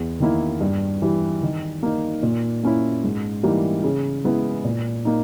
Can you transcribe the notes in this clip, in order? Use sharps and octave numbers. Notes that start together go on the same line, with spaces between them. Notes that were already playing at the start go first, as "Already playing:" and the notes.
Already playing: E2
D#3 A#3 E4
G2
E3 G3
D#3
A#3 D#4
A#2
A#3 C#4 E4
G#2
E3 G3 A#3 D#4
C#3
G#3 B3 E4
A#2
A#3 D#4